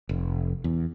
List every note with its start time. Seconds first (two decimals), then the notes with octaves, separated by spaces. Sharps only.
0.09 F1
0.64 E2